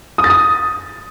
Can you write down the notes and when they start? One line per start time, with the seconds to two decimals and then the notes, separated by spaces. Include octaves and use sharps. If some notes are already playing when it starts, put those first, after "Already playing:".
0.18 D#6
0.24 A6
0.30 D#6